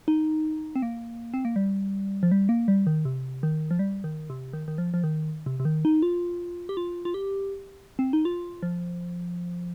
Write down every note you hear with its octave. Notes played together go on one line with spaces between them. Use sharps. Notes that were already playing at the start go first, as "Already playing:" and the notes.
D#4
C4
A#3
C4
A#3
G3
F3
G3
A#3
G3
D#3
C3
D#3
F3
G3
D#3
C3
D#3
D#3
F3
F3
D#3
C3
C3
D#3
D#4
F4
G4
F4
F4
G4
C4
D#4
F4
F3